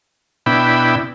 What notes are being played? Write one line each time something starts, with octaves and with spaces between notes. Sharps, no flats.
B2 D4 E4 G5 B5